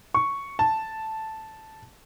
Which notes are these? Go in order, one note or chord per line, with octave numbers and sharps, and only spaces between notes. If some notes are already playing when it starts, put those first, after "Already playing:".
C#6
A5